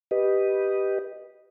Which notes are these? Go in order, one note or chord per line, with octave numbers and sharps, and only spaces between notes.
G4 B4 D#5